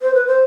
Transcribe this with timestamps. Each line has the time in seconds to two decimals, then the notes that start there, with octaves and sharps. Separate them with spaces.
0.02 C5
0.14 B4
0.27 C5